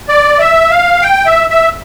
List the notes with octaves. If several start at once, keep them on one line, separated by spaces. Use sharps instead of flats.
D5
E5
F5
G5
E5
E5